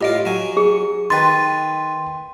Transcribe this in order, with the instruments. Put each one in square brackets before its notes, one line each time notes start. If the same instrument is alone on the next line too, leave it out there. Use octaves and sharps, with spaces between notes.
[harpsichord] A2 F4 [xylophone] G4 D#5 D7
[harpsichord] F#3 G#5
[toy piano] G#4
[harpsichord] D#3 B4 [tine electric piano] G5 C6 [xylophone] A6